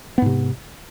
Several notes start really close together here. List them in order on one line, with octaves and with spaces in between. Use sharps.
B3 G#2 C3